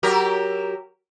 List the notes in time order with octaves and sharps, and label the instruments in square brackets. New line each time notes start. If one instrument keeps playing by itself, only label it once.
[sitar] F#3 G4 A#4